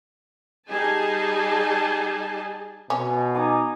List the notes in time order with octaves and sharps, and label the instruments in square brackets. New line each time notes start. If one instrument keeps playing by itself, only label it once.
[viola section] G3 D#4 G#4 G#5 A5
[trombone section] B2 [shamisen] C#4
[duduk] D#4 [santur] G#5 D6 D#6